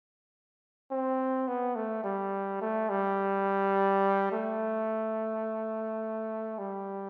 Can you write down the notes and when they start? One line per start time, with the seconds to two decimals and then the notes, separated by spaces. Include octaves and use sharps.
0.91 C4
1.48 B3
1.76 A3
2.04 G3
2.62 A3
2.90 G3
4.32 A3
6.58 G3